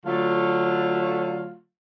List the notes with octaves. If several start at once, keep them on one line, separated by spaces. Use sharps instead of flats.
D3 F#3 A3 F4